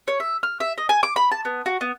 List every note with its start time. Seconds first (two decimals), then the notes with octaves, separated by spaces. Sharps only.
0.08 C#5
0.20 E5
0.43 F6
0.60 E5
0.78 D#5
0.89 G#5
1.03 D6
1.16 B5
1.32 A5
1.45 B3
1.66 F#4
1.81 B3